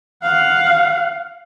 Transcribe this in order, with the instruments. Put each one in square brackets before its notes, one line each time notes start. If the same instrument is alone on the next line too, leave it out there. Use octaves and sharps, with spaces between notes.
[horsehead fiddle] F5 F#5